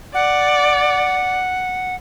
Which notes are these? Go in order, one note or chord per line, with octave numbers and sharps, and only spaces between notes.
D5 F#5